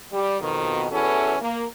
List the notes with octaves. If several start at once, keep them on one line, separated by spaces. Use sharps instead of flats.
G3
F2 B2 D#3
E2 E3 C#4 E4 F#4 A4
A#3